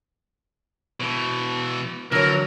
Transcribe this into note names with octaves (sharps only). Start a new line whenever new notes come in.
B2 E3
D3 E3 F#3 A#4